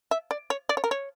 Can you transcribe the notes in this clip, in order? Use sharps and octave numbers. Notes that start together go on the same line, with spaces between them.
E5
D5
C#5
D5
C#5
A#4
C#5